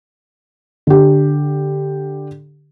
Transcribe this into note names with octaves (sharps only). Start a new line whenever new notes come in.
D3 G4